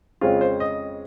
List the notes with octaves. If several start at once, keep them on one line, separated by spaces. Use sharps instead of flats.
F2 C#3 G#3 C4 F4
C5
D#5